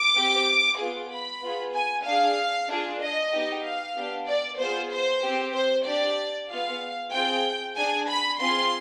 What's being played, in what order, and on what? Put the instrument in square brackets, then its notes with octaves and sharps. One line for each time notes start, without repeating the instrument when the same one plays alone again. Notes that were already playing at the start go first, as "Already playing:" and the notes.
Already playing: [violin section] D6
C4 G4
B3 F4 G#4
B5
B3 F4 G#4
G#5
D4 G#4 F5
D4 F4 G#4
D#5
B3 D#4 G4
F5
B3 D4 G4
D5
B3 F4 G#4 C5
C5
C4 G4
C5
D4 G4 D5
B3 F4 G#4 F5
C4 F4 G#4 G5
D4 G#4 G#5
B5
C4 F4 G#4 C6